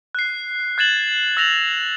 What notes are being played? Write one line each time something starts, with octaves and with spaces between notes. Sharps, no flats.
F#6 C7
F#6 G#6 A6 E7 F#7
E6 A6 A#6 F7 F#7